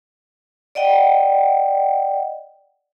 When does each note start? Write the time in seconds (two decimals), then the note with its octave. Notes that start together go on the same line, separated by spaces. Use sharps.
0.75 D5 D#5 F#5 G5